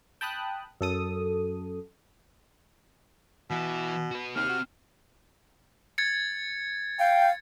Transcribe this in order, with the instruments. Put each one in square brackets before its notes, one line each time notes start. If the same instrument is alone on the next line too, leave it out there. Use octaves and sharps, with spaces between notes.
[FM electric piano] G5 A5 B5 D#6 F#6
F#2 A4 D#6
[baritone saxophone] B2 [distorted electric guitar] E3 E4
[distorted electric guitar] F#4 B4
[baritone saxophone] D#2 [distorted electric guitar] C4 G4 [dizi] F6
[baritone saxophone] F#4
[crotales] G#6 A6 C#7
[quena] F5 [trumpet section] G5